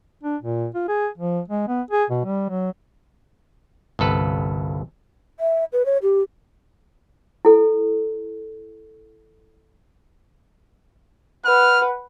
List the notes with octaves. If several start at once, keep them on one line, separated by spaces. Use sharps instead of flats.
D4
A#2
F4
G#4
F3
G#3
B3
G#4
B2
G3
F#3
G1 C2 A4 B4
E5
B4
C#5
G4
E4 A4
B4 F#5 F6